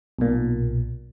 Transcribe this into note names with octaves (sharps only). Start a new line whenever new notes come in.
B1 A#2